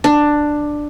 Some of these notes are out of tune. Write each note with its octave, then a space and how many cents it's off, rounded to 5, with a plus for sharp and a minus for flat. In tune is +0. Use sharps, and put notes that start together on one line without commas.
D4 +10